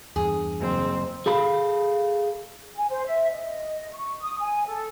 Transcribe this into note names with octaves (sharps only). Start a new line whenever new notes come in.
E2 G2 G#4
F#1 C4
G#4 A4 F5 B5
G#5
C5
E5
D#5
C#6
D#6
G#5
A4